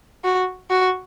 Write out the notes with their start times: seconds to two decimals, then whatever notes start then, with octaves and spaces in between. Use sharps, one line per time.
0.24 F#4
0.70 F#4